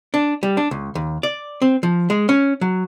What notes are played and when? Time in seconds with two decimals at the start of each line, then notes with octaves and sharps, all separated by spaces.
0.14 D4
0.43 G3
0.57 D4
0.71 C#2
0.95 D#2
1.23 D5
1.62 C4
1.83 F3
2.10 G#3
2.29 C#4
2.61 F#3